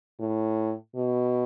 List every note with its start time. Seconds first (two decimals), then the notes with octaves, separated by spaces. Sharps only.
0.20 A2
0.96 B2